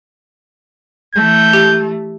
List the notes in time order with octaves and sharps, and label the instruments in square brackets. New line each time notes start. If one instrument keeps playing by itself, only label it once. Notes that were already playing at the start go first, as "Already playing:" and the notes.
[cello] E3 A3 [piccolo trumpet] G6
[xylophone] G4